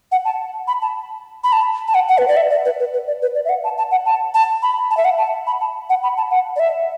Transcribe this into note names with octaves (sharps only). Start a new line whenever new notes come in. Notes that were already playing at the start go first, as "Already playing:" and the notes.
F#5
A5
B5
A5
B5
A5
A5
F#5
F#5
B4
D5
E5
D5
B4
B4
B4
D5
B4
D5
E5
F#5
A5
A5
F#5
A5
A5
B5
A5
E5
F#5
A5
B5
A5
F#5
B5
A5
F#5
D5
E5